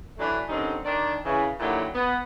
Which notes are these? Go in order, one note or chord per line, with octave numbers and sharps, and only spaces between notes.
E3 F#3 A3 D4
D3 D#3 G3 C4 C#4 D#4
D#3 D4 D5
C#3 E3
D#2 A#2 D3 F#3 E4 G4
B3